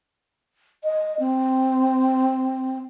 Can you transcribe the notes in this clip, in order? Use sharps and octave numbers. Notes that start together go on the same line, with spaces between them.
D#5
C4